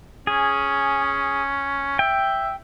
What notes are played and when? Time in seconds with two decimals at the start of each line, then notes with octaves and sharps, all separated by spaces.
0.27 C#4 G#4
1.99 E5 G5